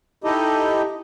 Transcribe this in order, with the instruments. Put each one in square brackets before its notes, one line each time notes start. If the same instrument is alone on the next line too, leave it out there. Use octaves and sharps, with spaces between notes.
[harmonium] D#4 E4 G4 A4 D#5